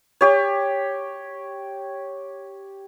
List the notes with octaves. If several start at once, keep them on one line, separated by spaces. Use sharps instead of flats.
G4 C#5